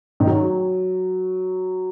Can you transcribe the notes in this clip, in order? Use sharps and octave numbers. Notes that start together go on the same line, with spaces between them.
D#3
F#3